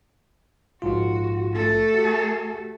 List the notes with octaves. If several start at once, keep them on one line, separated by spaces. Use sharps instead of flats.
A#1 G#2 F4 F#4
A3 A4
F#4 G4